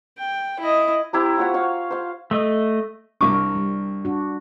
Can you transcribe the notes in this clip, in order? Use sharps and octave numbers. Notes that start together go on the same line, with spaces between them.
G5
E4 D#5
C4 E4 G4 A#5
F4 F#4 C#5 F#5
C#5 F5
C5 F5
A3 D#5
C2 D4 A#4 C#6 D6
G3
D4 F#4